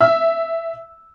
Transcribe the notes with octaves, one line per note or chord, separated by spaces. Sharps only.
E5 E6